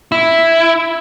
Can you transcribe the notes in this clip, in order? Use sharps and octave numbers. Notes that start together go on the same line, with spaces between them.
E4